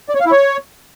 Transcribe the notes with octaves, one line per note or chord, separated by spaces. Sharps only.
D5
C#5
F5
E4
C#5